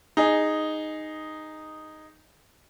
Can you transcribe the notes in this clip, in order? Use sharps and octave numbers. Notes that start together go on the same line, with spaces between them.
D#4 G#4